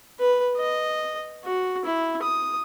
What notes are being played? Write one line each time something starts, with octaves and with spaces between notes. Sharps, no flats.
B4
D#5
F#4
E4
D#6